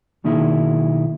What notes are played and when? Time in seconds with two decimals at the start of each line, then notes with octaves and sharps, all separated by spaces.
0.24 B1 D#3 A#3 D#4 E4 G#4